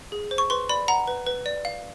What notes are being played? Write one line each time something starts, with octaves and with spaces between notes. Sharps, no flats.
G#4
C5
C#6
B4 C6
D5 B5
F#5 A#5
B4
B4
D5
F5